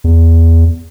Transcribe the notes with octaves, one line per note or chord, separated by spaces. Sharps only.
E2